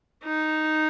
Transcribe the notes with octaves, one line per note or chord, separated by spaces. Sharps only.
D#4